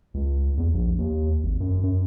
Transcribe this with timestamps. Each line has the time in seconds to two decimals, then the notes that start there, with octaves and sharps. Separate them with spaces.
0.14 C#2
0.57 E2
0.73 A#1
0.98 D#2
1.43 G#1
1.60 F#2
1.83 F#2